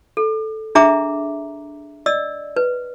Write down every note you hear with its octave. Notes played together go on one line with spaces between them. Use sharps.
A4
D4 G#4 E5 A#5 D6
D5 D#5 E6
B4